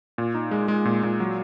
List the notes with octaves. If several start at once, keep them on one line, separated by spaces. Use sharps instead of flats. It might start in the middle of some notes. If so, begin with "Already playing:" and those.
A#2
D#4
G#3
G#3
A#2
A#2
F#3